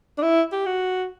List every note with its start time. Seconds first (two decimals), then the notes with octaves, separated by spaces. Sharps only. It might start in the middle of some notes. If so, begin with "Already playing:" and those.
0.18 D4
0.22 E4
0.52 G4
0.66 F#4